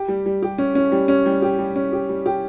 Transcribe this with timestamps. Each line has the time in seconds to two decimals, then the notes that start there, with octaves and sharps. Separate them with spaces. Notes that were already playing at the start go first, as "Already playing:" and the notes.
Already playing: G4
0.08 G3
0.26 G3
0.43 G4
0.58 C#4
0.75 C#4
0.92 G3
1.08 C#4
1.26 G3
1.42 G4
1.59 G3
1.76 C#4
1.92 G4
2.09 G3
2.26 G4